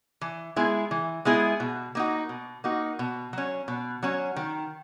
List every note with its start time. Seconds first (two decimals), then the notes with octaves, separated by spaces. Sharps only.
0.21 E3
0.56 G#3 B3 E4 G#4
0.91 E3
1.25 G#3 B3 E4 G#4
1.60 B2
1.95 A#3 D#4 F#4
2.29 B2
2.64 A#3 D#4 F#4
2.99 B2
3.33 F#3 C#4
3.68 B2
4.03 F#3 C#4
4.36 D#3